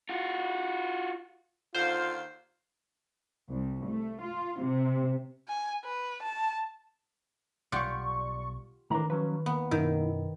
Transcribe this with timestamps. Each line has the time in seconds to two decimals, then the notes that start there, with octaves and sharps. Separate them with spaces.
0.09 F4 F#4
1.75 D#2 D3 F4 C5 F5
3.50 C2
3.86 A3
4.22 F4
4.62 C3
5.48 G#5
5.85 B4
6.23 A5
7.72 B1 G3 F4 G4 D5 F#5 C#6
8.90 A2 D#3 E3 D4 A#4 A#5
9.10 F3 F#3 C#4 B4
9.46 D#2 B3
9.71 F#2 B2 D#3 C#4 E4